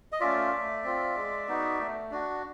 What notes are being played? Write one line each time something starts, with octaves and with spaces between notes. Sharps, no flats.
D#5
A3 C#4 F4 D5 E5
A3
C4 F4
G#3
B3 D#4 F#4
A3
D4 F#4